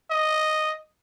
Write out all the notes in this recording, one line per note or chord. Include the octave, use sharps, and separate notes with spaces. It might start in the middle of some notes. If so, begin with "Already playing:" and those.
D#5